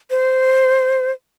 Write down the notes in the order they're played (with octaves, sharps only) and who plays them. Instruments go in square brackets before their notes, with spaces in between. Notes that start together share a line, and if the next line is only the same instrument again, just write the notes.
[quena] C5